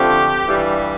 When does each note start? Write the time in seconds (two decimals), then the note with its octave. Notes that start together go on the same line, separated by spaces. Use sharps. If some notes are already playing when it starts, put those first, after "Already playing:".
Already playing: D3 F3 A3 C4 G4
0.47 G2 E3 G3